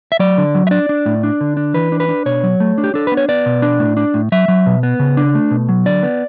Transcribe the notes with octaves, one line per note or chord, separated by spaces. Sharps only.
E5
F#3 D5
D3
F#3
E5
D4 D5
D4
A2
D4
D3
D4
E3 B4
D4
B4
D4
B2 C#5
F#3
A3
D4
G4
D4 A4
B3 B4
C#5
B3 D5
B2
D4
A2
D4
A2
F#3 E5
F#3
B2
B3
C#3
D4
A3
B2
F#3
D3 D5
B3